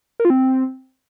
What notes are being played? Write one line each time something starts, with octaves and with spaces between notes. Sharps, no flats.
A#4
F4
C4